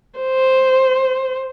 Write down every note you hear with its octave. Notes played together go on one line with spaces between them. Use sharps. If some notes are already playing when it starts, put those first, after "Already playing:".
C5